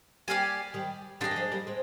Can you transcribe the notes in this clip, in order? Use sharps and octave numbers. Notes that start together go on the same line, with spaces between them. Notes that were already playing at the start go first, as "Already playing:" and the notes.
G3 A#3 G4 D5 F5 G#5
D#3 G3
D#3 G3 D4 F4 G#4 D#5
A#3
F3 G#3
G3 A#3
G#3 C4